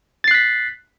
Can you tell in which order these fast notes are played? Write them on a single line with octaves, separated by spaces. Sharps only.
A6 C7 F#6 B6